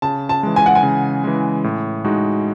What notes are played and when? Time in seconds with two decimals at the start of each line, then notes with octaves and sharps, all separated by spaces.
0.02 C#3 A5
0.29 A5
0.43 E3 G#3
0.56 G#5
0.66 F#5
0.75 G#5
0.83 C#3
1.24 E3 G#3
1.64 A2
2.05 G#3 D#4 F#4